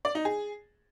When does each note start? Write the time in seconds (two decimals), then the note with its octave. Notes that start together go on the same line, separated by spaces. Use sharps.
0.05 D5
0.15 D#4
0.25 G#4